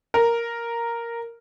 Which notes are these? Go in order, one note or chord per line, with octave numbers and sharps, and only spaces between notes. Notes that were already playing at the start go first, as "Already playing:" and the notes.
A#4